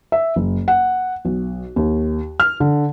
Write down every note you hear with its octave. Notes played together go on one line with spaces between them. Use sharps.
E5
F#1
F#5
B1
D#2
F6
D3